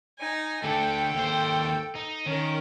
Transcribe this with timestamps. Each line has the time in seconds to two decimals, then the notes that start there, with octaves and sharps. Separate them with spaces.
0.19 D#4 G#5
0.64 D3 A3 A4 G5
1.15 D#2 C5
1.96 D#4
2.26 D#3 C#4 A#4